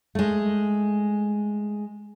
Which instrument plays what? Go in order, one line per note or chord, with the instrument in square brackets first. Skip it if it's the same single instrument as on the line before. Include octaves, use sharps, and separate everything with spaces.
[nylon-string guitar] G#3 A3